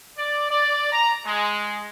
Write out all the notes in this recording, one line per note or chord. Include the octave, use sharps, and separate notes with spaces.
D5
D5
A#5
G#3